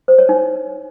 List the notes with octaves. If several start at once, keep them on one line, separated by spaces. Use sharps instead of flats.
C5
C#5
D#4